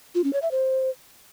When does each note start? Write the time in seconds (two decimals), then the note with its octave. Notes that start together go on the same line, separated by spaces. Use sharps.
0.15 F4
0.24 C#4
0.33 C#5
0.42 E5
0.51 C5